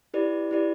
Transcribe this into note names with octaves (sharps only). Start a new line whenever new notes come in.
E4 G4 B4 D5
E4 G4 B4 D5